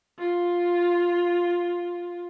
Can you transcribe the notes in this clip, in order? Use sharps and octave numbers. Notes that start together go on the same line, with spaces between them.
F4